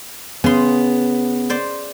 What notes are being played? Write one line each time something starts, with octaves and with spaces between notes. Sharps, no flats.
C#3 B3 C6
C5 D5